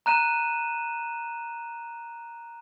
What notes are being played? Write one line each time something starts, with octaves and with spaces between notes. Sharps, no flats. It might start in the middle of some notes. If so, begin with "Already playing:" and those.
A#5 F#6 D#7 E7